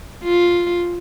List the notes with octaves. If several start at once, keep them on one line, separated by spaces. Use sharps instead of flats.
F4